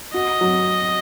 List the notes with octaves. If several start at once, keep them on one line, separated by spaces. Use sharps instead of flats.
F#4 D#5
F#3